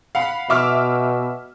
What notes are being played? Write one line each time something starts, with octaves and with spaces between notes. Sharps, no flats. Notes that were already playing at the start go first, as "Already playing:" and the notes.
F5 F#5 B5
B2 E5 D6 F6